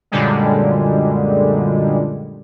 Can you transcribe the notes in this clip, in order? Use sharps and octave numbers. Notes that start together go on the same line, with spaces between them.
F#2 A#2 D3 G3 G#3